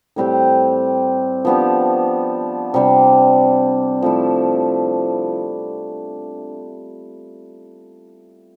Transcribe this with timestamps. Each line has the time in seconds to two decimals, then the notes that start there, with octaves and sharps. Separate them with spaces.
0.16 A2 G3 C4 G4
1.45 F3 B3 D4 G4
2.74 C3 G3 D4
4.02 F3 A3 E4